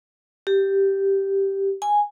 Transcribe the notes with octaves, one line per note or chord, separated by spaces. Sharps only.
G4
G#5